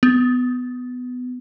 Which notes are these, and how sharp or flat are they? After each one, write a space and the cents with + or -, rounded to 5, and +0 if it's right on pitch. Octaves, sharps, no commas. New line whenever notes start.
B3 +15